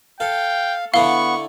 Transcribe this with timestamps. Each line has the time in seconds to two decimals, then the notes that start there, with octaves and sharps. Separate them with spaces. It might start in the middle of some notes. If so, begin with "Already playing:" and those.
0.20 A4 F5 G5
0.94 D3 A3 B3 E4 F5 C#6 G7